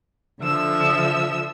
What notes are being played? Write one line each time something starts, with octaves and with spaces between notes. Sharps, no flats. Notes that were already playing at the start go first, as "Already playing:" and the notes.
D3 F3 E5 E6